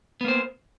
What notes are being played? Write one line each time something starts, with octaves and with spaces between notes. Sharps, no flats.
A#3 B3 C5